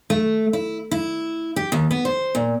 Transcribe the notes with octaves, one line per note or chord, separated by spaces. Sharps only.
A3
E4
E4
G4
D#2
B3
C5
A#2